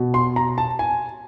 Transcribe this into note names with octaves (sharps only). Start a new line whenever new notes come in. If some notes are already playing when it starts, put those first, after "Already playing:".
Already playing: B2
C6
A#5
A5
G#5